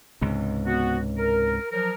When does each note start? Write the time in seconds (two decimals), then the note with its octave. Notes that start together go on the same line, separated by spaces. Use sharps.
0.21 C#2 G#2 C3
0.66 B3 F#4
1.18 A#4
1.71 F3 F#3 A#4